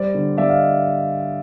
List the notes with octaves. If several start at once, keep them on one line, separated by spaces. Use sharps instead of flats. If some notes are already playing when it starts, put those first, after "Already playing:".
Already playing: G3 C5 D5
D3
G3 D5 E5
D#5 F5